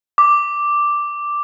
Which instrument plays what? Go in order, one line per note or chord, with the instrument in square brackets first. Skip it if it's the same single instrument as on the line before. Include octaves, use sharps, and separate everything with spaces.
[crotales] D6